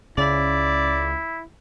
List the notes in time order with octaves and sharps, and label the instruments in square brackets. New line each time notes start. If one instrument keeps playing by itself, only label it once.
[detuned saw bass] C#2 [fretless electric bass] C#3 [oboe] E4 [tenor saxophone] D5